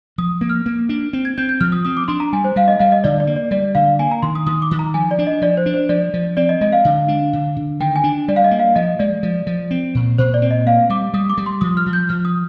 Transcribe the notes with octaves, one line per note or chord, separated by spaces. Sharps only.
F3 D#6
A#3
F6
A#3
D4
C4
G#6
C4 G6
G6
F3 F6
D#6
C4 D#6
D6
D4 C6
A#5
G3 G#5
C5
G3 F5
D#5
G3 F5
D#5
D3 D5
D5
A#3
D5
G3 D5
D3 F5
A#3 G#5
A#5
D#3 C6
D#6
D#3 D#6
D6
D#3
A#5
F3 G#5
D5
D4
D#5
F3 D5
C5
D4
C5
F3 D5
F3
C4 D5
D#5
G#3 D#5
F5
D3
D4
D3
D3
D#3 G5
G#5
D4
G3 D5
F5
D#5
A#3
F5
F3 D#5
G#3 D5
F3
F3
C4
A#2
A#2 C5
D5
C4
D#5
A#3 F5
G3 D6
G3 D#6
D6
G3
C6
F3 D#6
F6
F3
G6
F3 F6
D#6